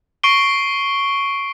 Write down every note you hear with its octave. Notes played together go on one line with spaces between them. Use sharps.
C#6 C7 D7 G7